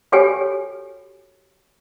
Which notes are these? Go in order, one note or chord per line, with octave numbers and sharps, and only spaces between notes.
F#4 G4 A4 C#5 G5 G#5